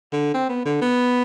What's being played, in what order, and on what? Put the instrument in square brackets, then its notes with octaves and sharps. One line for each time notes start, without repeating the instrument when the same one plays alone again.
[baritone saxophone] D3
C4
B3
D3
B3